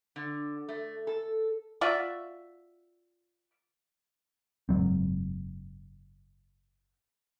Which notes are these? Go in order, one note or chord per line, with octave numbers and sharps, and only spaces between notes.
D3
A3
A4
F4 F#4 D5 E5
F#1 G#2 F#3 C4